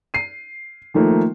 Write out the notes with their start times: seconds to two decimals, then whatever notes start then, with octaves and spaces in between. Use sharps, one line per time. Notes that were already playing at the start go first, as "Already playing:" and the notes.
0.14 C7 D#7
0.94 D#3 F3 A3 A#3